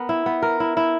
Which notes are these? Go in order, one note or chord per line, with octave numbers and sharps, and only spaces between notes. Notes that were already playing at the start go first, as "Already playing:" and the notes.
Already playing: B3 A#4
E4
B3
A#4
E4
E4